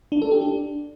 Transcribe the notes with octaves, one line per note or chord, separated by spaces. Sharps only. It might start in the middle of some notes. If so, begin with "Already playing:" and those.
D4
A4
G4
D4